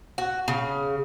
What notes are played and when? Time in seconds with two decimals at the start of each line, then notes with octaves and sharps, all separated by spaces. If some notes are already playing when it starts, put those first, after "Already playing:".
0.18 F#4
0.48 C#3